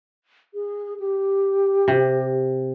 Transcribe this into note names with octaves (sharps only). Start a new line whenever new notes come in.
G#4
G4
C3